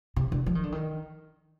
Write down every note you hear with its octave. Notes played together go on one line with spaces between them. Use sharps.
C3
D3
F3
D#3
D3
D#3